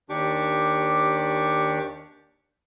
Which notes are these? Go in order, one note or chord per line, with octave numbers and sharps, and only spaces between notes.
D#2 D#3 D4 G4 C#6 D6